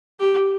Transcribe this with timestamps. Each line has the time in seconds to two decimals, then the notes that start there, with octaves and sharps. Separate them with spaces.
0.20 G4